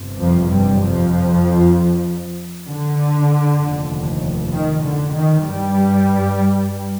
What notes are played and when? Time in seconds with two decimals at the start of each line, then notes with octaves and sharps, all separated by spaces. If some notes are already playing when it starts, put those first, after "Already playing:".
Already playing: G1 C3
0.20 F2 F3
0.50 G2 G3
0.81 F2 F3
2.67 D3
3.59 F1 D#2
4.52 D#3
4.83 D3
5.13 D#3
5.44 G2 G3